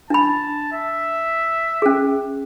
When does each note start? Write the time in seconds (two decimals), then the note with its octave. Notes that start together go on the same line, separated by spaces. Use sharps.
0.10 D4 A5 B5
0.72 E5
1.82 C#4 G#4